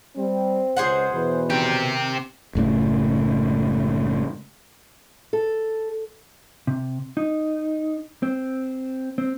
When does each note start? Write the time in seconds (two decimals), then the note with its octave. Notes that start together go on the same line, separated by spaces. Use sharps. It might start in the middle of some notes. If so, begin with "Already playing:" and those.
0.16 G3 C4
0.77 C#2 G#4 C5 F#5
1.12 E2 B2 E3 B4
1.50 D#3 C4 G4
2.55 F#1 A2 C#3 A3
5.33 A4
6.67 C3
7.17 D#4
8.23 C4
9.18 C4